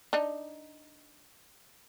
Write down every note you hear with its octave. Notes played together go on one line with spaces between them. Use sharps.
D4 D#4